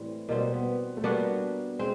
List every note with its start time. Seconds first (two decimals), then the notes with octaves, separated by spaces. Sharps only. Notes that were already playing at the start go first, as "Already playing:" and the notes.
Already playing: A2 E3 G3 C4
0.29 B2 G3 A#3 C4
0.54 B3
0.97 A3
1.04 G3 A#3 B3 D4 F#4
1.79 G#3 C4